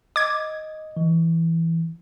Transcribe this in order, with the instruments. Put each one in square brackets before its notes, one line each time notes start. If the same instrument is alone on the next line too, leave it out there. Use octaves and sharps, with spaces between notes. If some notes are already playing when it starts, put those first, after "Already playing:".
[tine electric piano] D#5 [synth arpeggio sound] D6 G#6
[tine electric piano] E3